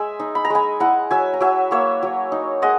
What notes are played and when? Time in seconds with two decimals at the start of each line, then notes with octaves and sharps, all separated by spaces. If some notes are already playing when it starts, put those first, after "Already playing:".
Already playing: G#3 E5 G#5
0.20 D#4
0.35 B5
0.45 A#5
0.50 G#3 G#5 B5
0.80 E4 F#5 A#5
1.11 F#3 E5 G#5
1.33 A#5
1.41 F#3 E5 G#5
1.71 A#3 C#5 E5
2.03 F#3
2.32 D#4
2.62 G#3 D#5 F#5